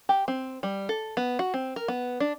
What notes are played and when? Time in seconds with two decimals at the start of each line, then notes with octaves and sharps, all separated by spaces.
0.09 G4
0.28 C4
0.63 G3
0.89 A4
1.17 B3
1.39 F#4
1.54 C4
1.76 A#4
1.88 B3
2.20 D4